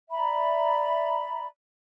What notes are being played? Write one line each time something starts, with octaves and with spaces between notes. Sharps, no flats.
D5 E5 A#5 B5